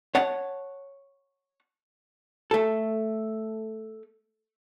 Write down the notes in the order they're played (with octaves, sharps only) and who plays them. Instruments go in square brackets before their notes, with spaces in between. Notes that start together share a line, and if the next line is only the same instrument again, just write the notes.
[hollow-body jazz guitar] C#5 F#5 A5
A3 A4